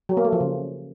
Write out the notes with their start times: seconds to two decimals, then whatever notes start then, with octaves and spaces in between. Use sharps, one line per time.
0.09 F#3
0.17 A#3
0.25 A3
0.32 F3
0.40 C#3